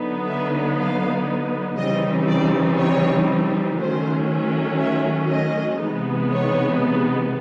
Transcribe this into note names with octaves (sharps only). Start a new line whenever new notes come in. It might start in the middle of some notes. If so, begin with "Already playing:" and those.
Already playing: D3 F#3 B3 D#4
E5
F5
C#3 E3 G3 C4 D#4 D#5
D5
C#5
D#3 F#3 A3 C#4 C5
E5
D#5
C3 E3 G#3 B3 D#4
C#5